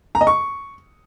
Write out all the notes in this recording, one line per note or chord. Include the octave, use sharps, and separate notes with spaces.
A#5
D#5
C#6